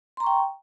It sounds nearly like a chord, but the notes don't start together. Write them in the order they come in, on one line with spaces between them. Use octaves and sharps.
C6 A#5 C#6 G5